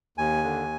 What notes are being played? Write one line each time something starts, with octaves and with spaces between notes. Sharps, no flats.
D#2 G#5
D3